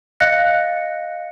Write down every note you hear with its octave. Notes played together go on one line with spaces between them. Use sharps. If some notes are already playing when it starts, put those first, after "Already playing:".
D#5 F5 F#6 A#6 C#7